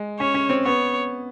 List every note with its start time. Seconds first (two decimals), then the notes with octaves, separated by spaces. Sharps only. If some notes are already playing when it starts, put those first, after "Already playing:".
Already playing: G#3
0.20 C#4 C#5
0.34 C#4
0.50 C4
0.65 B3 C#5